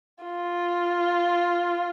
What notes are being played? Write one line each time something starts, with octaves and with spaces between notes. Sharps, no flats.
F4